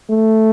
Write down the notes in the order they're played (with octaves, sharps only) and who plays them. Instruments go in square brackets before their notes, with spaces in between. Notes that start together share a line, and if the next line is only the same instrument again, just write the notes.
[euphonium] A3